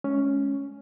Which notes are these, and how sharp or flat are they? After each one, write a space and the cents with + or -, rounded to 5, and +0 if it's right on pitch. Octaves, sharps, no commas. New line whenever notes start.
G#3 +35 C#4 +5